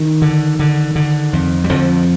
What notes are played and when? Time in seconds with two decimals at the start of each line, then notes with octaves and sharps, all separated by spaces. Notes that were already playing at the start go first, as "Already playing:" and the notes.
Already playing: D#3
0.22 D3
0.59 D3
0.96 D3
1.33 F2
1.64 G3
1.69 F2 D3 F3